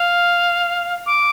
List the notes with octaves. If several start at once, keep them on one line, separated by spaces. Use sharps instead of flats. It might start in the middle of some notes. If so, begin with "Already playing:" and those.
Already playing: F5
D6